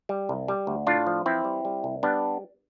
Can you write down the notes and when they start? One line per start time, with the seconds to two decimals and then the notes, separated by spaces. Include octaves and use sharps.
0.09 G3
0.29 C2
0.48 G3
0.67 D2
0.87 A2 D4 F4
1.07 F3
1.26 E3 C4 E4
1.45 G3
1.65 G3
1.84 C2
2.03 G3 B3 D4